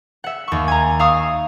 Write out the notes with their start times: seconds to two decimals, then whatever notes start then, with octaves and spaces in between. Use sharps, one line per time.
0.24 E5 F#5
0.48 D#2 C#6
0.68 G#5 A#5
0.99 E5 F5 A#5 C#6 D#6